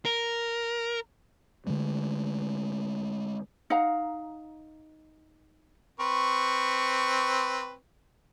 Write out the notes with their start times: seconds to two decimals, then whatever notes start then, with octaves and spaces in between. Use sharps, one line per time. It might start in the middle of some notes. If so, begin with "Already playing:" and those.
0.05 A#4
1.67 D3 D#3 G#3 A3
3.70 D#4 F5 F#5 A#5
6.00 C4 B4 C#6